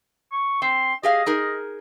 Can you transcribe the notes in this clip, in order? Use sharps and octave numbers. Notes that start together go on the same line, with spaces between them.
C#6
C4 C6
G4 G#4 D#5 F5
D#4 G#4 A#4